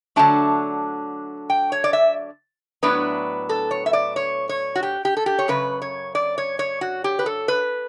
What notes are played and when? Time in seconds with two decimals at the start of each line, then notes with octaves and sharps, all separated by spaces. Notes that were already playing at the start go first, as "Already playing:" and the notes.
0.16 D3 F#3 A3 D4 A5
1.50 G5
1.72 C#5
1.84 D5
1.93 E5
2.83 A2 F#3 B3 D4 B4
3.49 A4
3.71 C#5
3.86 E5
3.93 D5
4.16 C#5
4.49 C#5
4.76 F#4
4.83 G4
5.05 G4
5.17 A4
5.26 G4
5.39 C#5
5.48 F#2 C#3 B4
5.82 C#5
6.15 D5
6.38 C#5
6.59 C#5
6.81 F#4
7.04 G4
7.19 B4
7.26 A4
7.48 B4